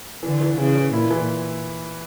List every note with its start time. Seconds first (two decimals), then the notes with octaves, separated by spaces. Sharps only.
0.23 D3 E3
0.41 E3
0.58 C#3 E3
0.75 E3
0.93 A#2 E4
1.11 E3